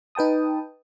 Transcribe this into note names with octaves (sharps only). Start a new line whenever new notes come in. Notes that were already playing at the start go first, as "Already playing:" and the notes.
D#4 B4 G5 A5 D#6